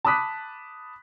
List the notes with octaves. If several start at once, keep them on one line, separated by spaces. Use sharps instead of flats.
A5 B5 D6 D#6 F#6 B6